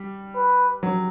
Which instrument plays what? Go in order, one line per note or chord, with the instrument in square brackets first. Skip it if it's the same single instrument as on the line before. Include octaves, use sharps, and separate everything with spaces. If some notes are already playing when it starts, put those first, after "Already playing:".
Already playing: [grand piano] G3
[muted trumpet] B4
[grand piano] F#3